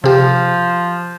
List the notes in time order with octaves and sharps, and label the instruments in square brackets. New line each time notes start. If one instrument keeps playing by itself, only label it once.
[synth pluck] C3 G4 [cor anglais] F3